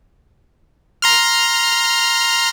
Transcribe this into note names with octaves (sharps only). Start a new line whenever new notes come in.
A#5 C6 F6